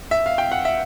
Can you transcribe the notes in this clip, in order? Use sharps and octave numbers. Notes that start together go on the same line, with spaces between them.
E5
F5
G5
F#5
E5